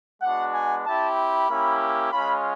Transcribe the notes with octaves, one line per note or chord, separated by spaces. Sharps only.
G#3 B3 D4 F#4 F#5
G#5
C4 E4 G4 A5
B5
A#3 C#4 E4 G4
G#3 C#4 F4 B5